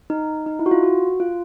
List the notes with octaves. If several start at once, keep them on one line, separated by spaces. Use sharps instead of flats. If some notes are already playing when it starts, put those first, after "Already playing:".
D#4
D#4
E4
F#4
F4
F#4
F4